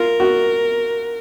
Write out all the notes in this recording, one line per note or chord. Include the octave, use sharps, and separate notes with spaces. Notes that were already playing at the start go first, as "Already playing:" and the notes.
Already playing: F4 A#4
F#4